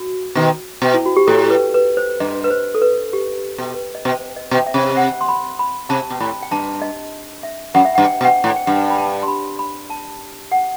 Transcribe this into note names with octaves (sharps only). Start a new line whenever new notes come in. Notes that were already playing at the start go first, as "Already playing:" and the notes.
Already playing: F#4
B2 D#3
B2
E4
F#4
G4
A2 A4
B4
B4
C5
G2 D#5
B4
C5
A4
B4
G4
B2
B4
D#5
B2 C5
D#5
B2
E5
C3
F#5
C6
B5
B5
C3 A5
B2
A2 B5
G5
G2 A5
D#5
E5
F#2 F#5
E5
G2 F#5
G5
B2
F#5
G5
A2
G5
G2 F#5
B5
A5
C6
B5
B5
A5
F#5